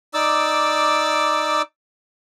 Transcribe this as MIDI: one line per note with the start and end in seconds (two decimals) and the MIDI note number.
0.14 1.62 63
0.14 1.62 74
0.14 1.62 86
0.14 1.62 88